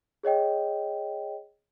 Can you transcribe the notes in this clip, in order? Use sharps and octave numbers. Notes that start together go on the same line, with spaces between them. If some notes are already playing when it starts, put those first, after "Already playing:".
G#4 C#5 D#5 G5